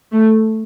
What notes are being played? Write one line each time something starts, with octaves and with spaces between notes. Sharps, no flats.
A3